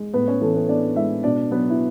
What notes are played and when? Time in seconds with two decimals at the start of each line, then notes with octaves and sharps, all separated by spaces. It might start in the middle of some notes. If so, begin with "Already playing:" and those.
Already playing: G#3
0.14 A2 B3 B4
0.27 C#4 C#5
0.41 E3 A3 A4
0.55 B3 B4
0.68 B3 D4 D5
0.96 G#3 E4 E5
1.24 B2 D4 D5
1.51 F#3 B3 B4
1.70 E4